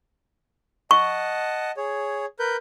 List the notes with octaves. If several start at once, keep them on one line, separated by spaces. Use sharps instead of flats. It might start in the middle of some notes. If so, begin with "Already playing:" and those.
D#5 F#5 A5 C#6
G#4 C#5
A#4 B4 G6